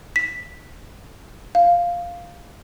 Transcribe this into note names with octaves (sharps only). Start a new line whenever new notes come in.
B6
F5